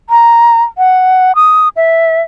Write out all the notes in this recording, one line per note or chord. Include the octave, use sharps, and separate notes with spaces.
A#5
F#5
D#6
E5